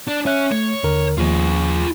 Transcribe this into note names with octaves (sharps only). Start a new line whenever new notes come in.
D4
C#4 C#5 E5 F#6
A3 C#5
D#2 D3 A#4
D#2 F3 F4 G#4